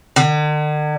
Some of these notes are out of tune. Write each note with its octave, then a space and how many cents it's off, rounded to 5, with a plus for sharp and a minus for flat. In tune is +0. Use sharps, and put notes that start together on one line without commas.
D3 +45